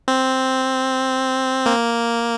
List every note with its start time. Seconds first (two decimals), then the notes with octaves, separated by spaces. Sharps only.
0.08 C4
1.66 A#3